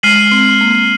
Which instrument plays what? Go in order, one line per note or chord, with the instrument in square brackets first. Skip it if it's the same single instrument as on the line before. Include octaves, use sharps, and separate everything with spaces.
[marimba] G#3 [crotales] F6 C7 D#7 F#7
[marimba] C4
A#3